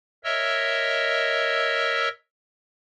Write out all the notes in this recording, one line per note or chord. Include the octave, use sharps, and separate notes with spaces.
A#4 C#5 D#5 E5 E6